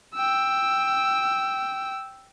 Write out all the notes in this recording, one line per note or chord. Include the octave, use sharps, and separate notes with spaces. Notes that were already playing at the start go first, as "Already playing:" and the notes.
G5 E6